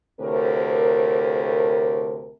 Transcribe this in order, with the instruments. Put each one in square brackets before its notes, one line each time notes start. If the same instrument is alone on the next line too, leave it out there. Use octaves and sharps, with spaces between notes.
[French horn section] D2 A2 C3 A#4